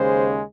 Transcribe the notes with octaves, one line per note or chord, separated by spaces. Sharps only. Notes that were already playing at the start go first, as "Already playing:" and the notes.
Already playing: D#2 C#3 G#3 C5